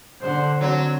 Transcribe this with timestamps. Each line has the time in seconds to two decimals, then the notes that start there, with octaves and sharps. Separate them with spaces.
0.21 D3 C5 F#5
0.61 F#3 C4